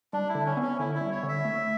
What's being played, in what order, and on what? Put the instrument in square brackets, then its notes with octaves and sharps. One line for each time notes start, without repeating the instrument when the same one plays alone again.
[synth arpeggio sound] G3 [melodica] D4
[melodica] E4
[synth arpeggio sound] D3
[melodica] C#4
[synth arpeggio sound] B3
[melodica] C#4
[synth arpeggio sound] D3 [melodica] E4
[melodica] E4
[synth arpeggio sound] G3
[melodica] C#5
[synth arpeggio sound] D3
[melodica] E5
[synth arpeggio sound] A3